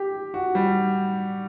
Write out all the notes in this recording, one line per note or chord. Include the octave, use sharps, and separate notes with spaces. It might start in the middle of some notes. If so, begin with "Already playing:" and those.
Already playing: G4
F#4
G3